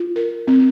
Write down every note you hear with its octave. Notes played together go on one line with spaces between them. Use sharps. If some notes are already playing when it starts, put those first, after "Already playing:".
Already playing: F4
A#4
C4